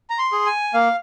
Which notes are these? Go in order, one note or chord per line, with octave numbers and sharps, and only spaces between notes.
A#5
C6
G#4
G#5
A#3 F5